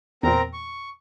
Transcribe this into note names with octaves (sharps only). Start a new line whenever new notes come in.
E2 A#2 C4 A#4 A#5
C#6